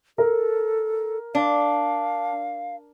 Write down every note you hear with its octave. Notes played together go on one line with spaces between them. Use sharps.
A4 A#4
D4 F5